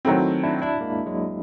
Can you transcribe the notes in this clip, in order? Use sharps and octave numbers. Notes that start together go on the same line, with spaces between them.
D#3 F#3 A3 C4 E4 F#4
D4 E4
D4 E4
G#3 A#3
F#3 G#3